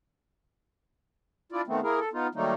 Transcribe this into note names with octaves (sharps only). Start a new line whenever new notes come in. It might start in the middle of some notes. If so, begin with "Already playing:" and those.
D4 E4 F4 D5
D#3 A3 B3 C4
A#3 E4 G#4 A#4
A4
B3 D#4 F4
D#3 F#3 G3 A3 A#3 D#4